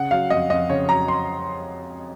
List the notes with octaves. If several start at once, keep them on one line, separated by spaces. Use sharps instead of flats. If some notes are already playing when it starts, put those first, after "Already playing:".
Already playing: C#3 F#5
F#3 F5
F2 D#5
F2 D#5
C#3 C#5
F#3 A#5
C6